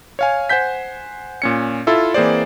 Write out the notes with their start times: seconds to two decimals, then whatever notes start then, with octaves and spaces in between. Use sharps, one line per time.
0.19 C#5 F5 G#5
0.49 C5 F#5 G#5 G6 B6
1.42 A#2 C#4 C#7
1.87 E4 F4 A4 E5
2.14 E3 A#3 C4 G#4 C5 D5